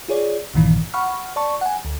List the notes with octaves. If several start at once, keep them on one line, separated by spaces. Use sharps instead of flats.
F4 G#4 C#5 D5
A#1 G2 A#2 D#3 E3
F#5 B5 C#6 F6
D5 A5 C#6
F#5 G#5
D2